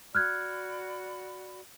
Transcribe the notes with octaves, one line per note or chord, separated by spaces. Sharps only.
F#4 D5 B5 F6 F#6 G#6